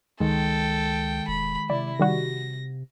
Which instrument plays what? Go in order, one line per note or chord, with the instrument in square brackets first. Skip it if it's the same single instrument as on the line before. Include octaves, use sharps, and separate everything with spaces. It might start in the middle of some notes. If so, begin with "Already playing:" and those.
[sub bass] C#2 [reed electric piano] D#3 G#3 [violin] A4 G5
[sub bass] E1 [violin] B5
[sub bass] C3 [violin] E4 [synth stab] D5
[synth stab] D#3 G3 F#4 [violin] A#6